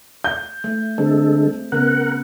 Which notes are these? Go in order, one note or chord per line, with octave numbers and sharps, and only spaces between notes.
G6
A3
D3 G#3 C4 A4
C#3 B3 A#4 F#5